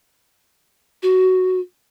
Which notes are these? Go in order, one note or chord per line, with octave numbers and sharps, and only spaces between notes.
F#4